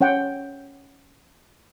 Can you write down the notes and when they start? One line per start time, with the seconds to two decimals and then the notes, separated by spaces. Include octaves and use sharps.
0.01 C#4 C#5 F#5 G5